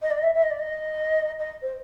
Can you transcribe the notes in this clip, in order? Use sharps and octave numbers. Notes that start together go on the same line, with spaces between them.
D#5
D5
D#5
E5
E5
D#5
D5
D#5
D#5
C5